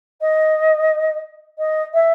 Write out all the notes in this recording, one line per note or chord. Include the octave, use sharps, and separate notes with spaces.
D#5
D#5
E5